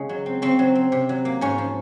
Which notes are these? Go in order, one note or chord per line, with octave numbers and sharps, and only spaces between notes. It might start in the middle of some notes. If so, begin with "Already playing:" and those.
Already playing: C#3 G#3
F#3
C4
C#3 C4
F#3
C4
C3
F#3
A#3
G#2 C#4
F3